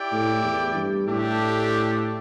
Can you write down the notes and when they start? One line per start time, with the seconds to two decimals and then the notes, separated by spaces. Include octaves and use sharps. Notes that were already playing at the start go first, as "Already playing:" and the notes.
Already playing: E4 G4 D5 G5
0.12 A2
0.44 E2
0.75 G2
1.07 A2 A3 D4 G4